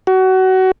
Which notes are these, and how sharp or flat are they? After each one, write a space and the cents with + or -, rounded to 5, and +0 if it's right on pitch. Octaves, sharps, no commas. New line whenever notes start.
F#4 +25